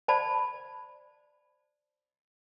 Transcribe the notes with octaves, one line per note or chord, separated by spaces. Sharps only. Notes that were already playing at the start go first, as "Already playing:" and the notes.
C5 D5 A5 B5